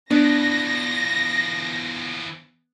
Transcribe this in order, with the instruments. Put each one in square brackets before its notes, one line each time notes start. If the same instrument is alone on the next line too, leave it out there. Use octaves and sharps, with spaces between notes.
[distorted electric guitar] E3 F3 [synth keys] B3 [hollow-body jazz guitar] D4 [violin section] A#6